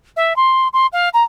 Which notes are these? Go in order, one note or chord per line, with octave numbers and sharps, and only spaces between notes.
E5
C6
C6
F5
A#5